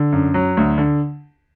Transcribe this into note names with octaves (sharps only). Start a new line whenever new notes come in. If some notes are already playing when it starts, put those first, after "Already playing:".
Already playing: D3
F#2
F#3
D2
D3